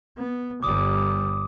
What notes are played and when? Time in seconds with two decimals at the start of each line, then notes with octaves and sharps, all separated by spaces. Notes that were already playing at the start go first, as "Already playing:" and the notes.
0.17 B3
0.63 G1 G3 D6 D#6